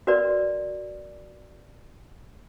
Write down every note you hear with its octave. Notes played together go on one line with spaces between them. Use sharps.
F#4 A#4 B4 D5